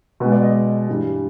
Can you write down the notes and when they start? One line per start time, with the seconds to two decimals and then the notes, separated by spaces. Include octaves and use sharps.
0.20 B2 B4
0.25 G#3
0.32 D5
0.43 D#5
0.88 G2 E3 G3